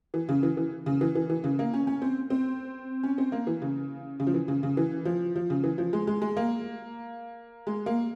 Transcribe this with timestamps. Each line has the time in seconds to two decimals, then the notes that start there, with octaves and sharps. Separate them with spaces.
0.14 E3
0.29 C#3
0.43 E3
0.57 E3
0.86 C#3
1.01 E3
1.15 E3
1.30 E3
1.44 C#3
1.59 A#3
1.74 C#4
1.87 C#4
2.02 C4
2.30 C4
3.03 C#4
3.18 C4
3.32 A#3
3.47 E3
3.62 C#3
4.20 C#3
4.27 F3
4.34 E3
4.48 C#3
4.63 C#3
4.77 E3
5.05 F3
5.36 F3
5.50 C#3
5.64 E3
5.78 F3
5.93 G#3
6.07 G#3
6.22 G#3
6.37 A#3
7.67 G#3
7.86 A#3